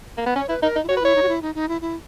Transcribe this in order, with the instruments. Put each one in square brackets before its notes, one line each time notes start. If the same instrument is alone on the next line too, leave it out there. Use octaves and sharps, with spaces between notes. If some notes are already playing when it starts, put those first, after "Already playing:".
[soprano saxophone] A#3
B3
[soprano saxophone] C#4 [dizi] C#5
[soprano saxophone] E4 [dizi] B4
[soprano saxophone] D#4 [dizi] A#4
[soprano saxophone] D#4
[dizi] E4
[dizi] F#4 [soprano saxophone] C#5
[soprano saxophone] B4
[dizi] E4 [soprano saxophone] C#5
[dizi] D#4
F#4
E4
D#4
D#4
E4
E4